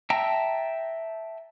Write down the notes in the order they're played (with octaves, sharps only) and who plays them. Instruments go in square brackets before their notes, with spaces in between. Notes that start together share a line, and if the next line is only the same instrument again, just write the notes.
[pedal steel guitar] E5 G5 A5 A#5 E6